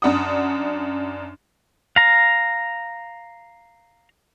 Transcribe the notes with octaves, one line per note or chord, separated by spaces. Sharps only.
F#2 D4 F#5 D#6
F5 A#5